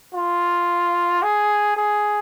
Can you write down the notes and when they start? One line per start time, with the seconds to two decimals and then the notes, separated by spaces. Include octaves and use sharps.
0.14 F4
1.23 G#4
1.77 G#4